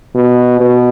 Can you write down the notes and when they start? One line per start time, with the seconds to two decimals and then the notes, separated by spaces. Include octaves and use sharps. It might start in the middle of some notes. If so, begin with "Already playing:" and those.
0.15 B2
0.61 B2